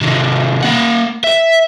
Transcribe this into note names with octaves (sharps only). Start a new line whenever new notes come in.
C3 D#3
A#3 F#5
E5